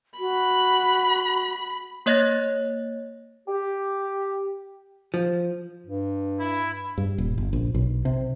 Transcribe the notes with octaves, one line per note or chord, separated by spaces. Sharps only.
F#4 B5
A#3 C#5 D#5 F#6 A6 A#6
G4
F3
G2
E4
G2
D#1
G1
A#1
B1
C3